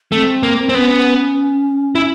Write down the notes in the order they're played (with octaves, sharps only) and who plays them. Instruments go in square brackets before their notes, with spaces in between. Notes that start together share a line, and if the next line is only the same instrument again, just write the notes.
[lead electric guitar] A3 [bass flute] C4
[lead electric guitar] A#3
C4
[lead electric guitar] B3 [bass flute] C#4
[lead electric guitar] E4